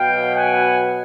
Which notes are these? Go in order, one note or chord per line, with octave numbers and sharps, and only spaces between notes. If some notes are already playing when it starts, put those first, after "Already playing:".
Already playing: B2 F#3 B3 F5 G5
F#5 G#5